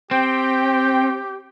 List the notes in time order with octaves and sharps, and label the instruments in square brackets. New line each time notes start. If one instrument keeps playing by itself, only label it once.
[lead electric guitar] C4 [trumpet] G4 [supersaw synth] G5